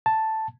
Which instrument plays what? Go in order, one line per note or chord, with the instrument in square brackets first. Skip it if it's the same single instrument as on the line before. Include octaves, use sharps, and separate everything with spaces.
[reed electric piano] A5